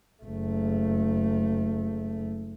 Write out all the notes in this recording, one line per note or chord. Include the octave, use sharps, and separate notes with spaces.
F#1 A3